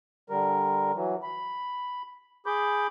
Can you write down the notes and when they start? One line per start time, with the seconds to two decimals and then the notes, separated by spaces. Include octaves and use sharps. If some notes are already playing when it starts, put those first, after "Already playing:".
0.30 D3 G3 A#4
0.94 E3 F#3
1.23 B5
2.46 G#4 B5 D6 G6